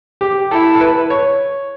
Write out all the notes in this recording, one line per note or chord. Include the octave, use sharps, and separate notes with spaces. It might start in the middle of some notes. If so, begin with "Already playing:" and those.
G4
E4 A4
A4
B4
C#5